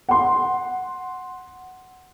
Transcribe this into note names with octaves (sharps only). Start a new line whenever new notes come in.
F#5 C6